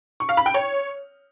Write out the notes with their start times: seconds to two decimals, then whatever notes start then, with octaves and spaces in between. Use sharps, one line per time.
0.20 C#6
0.29 F5
0.37 B5
0.46 G5
0.54 C#5